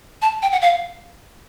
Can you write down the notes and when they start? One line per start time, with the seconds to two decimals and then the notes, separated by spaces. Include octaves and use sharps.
0.22 A5
0.42 G5
0.52 F#5
0.62 F5